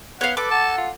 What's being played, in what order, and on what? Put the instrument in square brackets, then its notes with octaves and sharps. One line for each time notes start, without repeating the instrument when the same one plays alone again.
[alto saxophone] B3 [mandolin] C#5 F5 [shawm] F#5
[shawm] A4 [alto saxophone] B4 [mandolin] D6
[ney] F#5 [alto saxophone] A5
[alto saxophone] F4